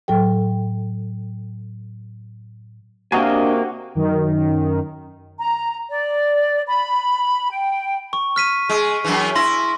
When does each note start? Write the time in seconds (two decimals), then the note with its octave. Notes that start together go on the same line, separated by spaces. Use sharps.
0.08 A2 F#3 A4 G5
3.12 C3 A#3 D4 F#4 D#5 G#5
3.95 F#2 D#3
5.38 A#5
5.89 D5
6.66 B5
7.50 G5
8.13 C#6
8.36 F6 B6 D#7
8.69 G#3
9.04 F#2 E3
9.35 E4 C6 A#6